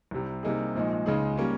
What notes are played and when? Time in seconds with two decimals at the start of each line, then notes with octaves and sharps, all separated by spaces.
0.11 C2 C3 G3
0.43 C3 G3 A#3 D#4 G#4
0.75 A#1 A#2 F3 G#3 D#4
1.06 C#2 C#3 G#3 D#4 G#4
1.37 G3 A#3 C#4